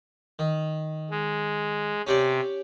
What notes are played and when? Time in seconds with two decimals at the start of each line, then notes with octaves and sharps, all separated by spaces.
0.39 D#3
1.11 G#3
2.07 C3 C#4 G4 D5